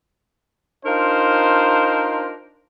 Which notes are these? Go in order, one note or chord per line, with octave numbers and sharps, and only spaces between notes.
D4 D#4 F4 A#4 C5